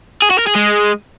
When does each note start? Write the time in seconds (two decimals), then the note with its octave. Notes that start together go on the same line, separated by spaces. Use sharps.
0.22 G#4
0.30 F#4
0.39 A#4
0.47 G#4
0.56 G#3